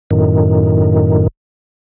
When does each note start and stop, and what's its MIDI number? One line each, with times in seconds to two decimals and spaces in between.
0.11 1.27 42
0.11 1.27 45
0.11 1.27 51